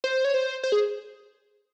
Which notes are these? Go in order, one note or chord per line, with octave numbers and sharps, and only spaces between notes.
C5
C#5
C5
C5
G#4